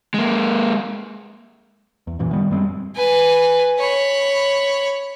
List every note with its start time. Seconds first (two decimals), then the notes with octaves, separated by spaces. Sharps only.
0.14 G#3 A#3
2.07 E2
2.19 F#2 A#2 E3
2.33 D#3 G3 B3
2.51 F#2 G3 G#3 C4
2.96 B4 G#5
3.79 C#5 B5